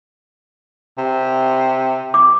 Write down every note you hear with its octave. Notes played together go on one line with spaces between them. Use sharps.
C3
D6